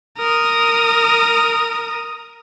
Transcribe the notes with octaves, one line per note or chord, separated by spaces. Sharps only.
A#4 D#6